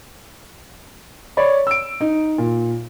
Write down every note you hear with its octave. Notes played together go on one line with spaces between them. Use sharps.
C#5 D5 B5
E6 D7
D#4
A#2